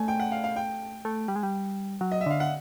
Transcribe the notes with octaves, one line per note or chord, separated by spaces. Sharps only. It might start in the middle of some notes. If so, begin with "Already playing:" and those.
Already playing: A3 G#5
G5
F#5
F5
F5
G5
A3
G3
G#3
G3
F#3
D#5
E5
D3 F5
F#5